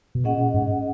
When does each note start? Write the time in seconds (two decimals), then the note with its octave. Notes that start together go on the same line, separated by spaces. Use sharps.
0.15 B2
0.24 A#2 C#4 G#4 D#5 F#5
0.54 G#2